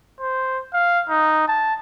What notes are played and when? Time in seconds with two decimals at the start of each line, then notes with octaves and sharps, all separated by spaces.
0.20 C5
0.73 F5
1.09 D#4
1.48 A5